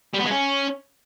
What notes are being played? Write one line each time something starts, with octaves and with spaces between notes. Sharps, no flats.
G3
B3
G#3
C#4